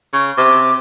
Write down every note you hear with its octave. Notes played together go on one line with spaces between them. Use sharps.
C#3
C3 D6